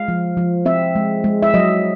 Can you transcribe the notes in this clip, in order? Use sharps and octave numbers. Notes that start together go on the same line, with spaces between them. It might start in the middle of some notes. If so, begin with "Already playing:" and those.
Already playing: G#3 F5
F3
F3
C4 E5
G#3
G#3
E5
F#3 D#5